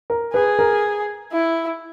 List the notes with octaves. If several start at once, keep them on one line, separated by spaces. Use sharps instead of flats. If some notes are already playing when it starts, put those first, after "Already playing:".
A#4
G#4 B4
A#4
E4